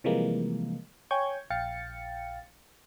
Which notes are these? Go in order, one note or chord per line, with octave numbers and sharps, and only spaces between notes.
C3 E3 F3 G3 G#3 A#3
C#5 G5 G#5 C#6 G6 G#6
A#1 F5 G5 A6 C#7